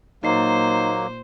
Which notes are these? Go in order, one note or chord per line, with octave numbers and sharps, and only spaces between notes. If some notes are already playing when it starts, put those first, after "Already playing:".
A#2 F#3 A#3 D#4 C5 D#5 C7